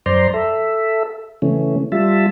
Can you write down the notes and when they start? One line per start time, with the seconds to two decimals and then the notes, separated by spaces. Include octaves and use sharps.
0.06 F#2 C5 D5 A#5 C6
0.34 A4 E5
1.42 C#3 E3 A3 C#4
1.92 G3 F4 E5 A5